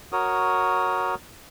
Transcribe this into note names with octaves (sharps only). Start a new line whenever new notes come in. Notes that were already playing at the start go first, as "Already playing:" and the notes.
F#4 A#4 C#5 D#6